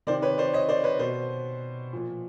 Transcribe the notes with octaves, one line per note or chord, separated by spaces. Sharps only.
C3 D#3 C5 D5
B4 C#5
C5 D5
C#5 D#5
C5 D5
B4 C#5
B2 C5
A#2 F3